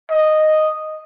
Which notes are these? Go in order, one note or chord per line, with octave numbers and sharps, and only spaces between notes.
D#5